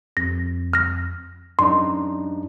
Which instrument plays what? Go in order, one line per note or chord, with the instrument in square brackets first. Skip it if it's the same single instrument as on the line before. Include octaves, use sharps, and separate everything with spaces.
[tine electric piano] F2 [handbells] A#6
[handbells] F6 A#6
[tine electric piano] F#2 D4 D#4 [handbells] C6